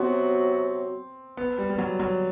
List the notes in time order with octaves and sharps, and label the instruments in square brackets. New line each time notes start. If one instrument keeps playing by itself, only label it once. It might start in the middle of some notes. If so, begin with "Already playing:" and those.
Already playing: [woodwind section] C3 F#3 B3 F#4 [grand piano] C4
[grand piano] B3
G3
G3
F#3
F#3